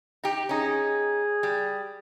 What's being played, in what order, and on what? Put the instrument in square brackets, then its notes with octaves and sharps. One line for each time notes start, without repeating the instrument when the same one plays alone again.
[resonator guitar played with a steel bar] D#4 G4
[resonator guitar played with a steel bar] C#4 D#4 [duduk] G#4
[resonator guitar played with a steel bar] G3